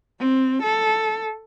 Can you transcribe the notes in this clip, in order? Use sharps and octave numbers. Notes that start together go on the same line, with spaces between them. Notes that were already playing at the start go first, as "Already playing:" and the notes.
C4
A4